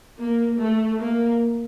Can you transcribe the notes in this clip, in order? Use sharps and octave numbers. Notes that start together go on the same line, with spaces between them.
A#3
A3
A#3